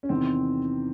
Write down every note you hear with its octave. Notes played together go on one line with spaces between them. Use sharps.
C#4
E2 C3 D#3 C4